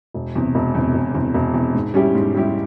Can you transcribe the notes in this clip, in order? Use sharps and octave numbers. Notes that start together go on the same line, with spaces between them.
E1
E2 C3
E1
E2 C3
E1
E2 C3
E1
E2 C3
G#2
G3 C#4 E4 G4
G#2
G3 C#4 E4 G4